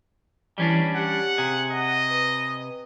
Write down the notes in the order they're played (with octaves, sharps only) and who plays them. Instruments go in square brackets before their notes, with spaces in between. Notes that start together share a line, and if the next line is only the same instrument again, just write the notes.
[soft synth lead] E3 [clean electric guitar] G3 C#4 D4
[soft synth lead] G4 [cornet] F#5
[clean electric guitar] C3 G#4
[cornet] D#5 [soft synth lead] F#5
[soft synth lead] B4